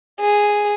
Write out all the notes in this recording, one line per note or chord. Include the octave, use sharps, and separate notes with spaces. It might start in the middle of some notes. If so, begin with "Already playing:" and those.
G#4